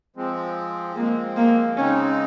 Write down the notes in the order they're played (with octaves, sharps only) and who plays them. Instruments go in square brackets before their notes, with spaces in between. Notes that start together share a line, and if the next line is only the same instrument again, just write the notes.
[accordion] F3 G#3 C4
[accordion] F3 G#3 C4 [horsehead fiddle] A#3
[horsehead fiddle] A#3
[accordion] C#3 G#3 C4 D#4 [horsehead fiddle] C#4